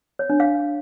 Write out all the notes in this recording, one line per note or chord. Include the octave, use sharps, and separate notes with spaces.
C#5
D4
F5